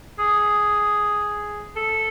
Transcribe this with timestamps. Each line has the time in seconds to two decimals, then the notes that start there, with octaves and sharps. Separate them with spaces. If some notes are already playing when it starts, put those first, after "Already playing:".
0.19 G#4
1.76 A4